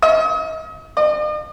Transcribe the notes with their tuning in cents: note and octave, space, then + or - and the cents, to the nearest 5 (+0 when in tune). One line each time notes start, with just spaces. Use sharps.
D#5 +40
D#5 -45